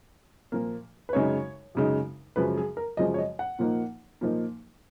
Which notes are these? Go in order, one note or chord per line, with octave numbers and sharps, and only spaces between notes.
A#2 F3 A#3
B4
F#2 C#3 G#3 D#4 C#5
F#2 C#3 G#3 D#4
F#2 C#3 F3 G#3 B4
G#4
A#4
F#2 C#3 F3 G#3 D#5
C#5
D#5
F#5
A#2 F3 A#3 D#4
A#2 F3 A#3 D#4